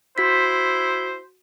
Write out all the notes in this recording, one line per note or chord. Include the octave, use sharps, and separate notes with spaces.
E4 F#4 C5 B6